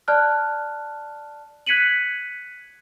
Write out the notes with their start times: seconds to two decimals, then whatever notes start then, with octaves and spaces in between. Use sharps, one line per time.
0.08 D5 A5 F6 F#6
1.66 F#6 G#6 B6 C#7 D#7 F#7